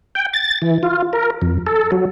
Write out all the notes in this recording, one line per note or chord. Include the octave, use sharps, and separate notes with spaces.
G5
A6
E3
F4
A#4
F2
A4
F#3